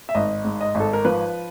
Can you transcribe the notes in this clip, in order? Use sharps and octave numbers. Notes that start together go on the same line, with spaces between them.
E5
G#1 D#5
G#2
D#5
G#1
A4
A#4
F3 B4